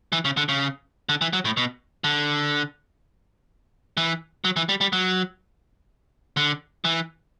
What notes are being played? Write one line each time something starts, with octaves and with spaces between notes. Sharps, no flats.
E3
C#3
D3
C#3
D3
E3
F#3
A2
B2
D3
E3
F#3
E3
G3
G3
F#3
D3
E3